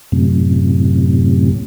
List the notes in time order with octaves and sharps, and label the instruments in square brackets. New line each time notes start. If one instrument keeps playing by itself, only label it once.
[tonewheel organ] F#2 A2 C3